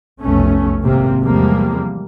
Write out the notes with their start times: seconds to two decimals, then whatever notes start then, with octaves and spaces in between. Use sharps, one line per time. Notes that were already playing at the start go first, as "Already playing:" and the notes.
0.22 F1 B1 B2 A3 C#4
0.84 G#1 C3 A#3 C4
1.23 E2 C3 F3 G3 G#3 A#3